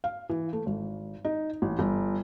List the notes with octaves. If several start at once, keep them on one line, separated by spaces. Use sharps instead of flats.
F5
E3
A3
G#1
D#4
A1
G1